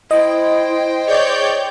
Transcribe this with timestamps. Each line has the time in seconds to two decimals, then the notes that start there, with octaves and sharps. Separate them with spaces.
0.11 E4 C5 D#5 G5
1.06 G#4 C#5 D5 G6